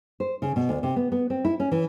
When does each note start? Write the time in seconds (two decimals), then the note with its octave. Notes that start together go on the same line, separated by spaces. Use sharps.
0.20 C5
0.42 C#3
0.56 B2
0.69 D2
0.83 C3
0.96 B3
1.12 B3
1.30 C4
1.45 E4
1.60 C#4
1.72 E3